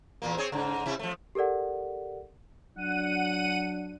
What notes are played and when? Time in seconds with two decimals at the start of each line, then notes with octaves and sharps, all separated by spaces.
0.22 E2 A#2 A#3
0.37 C4 G#4 C#5
0.52 G#2 C#3
0.86 C3 E4
0.99 F3 A3
1.35 G4 A4 A#4 D5 F#5
2.76 F#3 D4 F#5 D#7